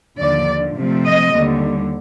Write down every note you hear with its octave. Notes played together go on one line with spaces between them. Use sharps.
D#2 D3 F3 D5
C3 F3 A3 C4
D#5
D#2 D3 G3